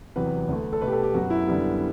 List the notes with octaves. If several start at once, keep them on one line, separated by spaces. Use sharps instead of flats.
E2 C3 F#3 B3 B4
D2 D3 A3
A4
B2 A3 B4
G4
A4
G4
F#2 F#3 B3 F#4
E4
F#2 D3 G3 B3